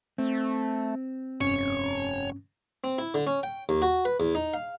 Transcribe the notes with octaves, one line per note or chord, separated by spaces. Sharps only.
A3 C4
F1 G2 C#4 C#5
C4
E4
D3
C#4
G5
D#2
F#4
B4
E2
D#4
F5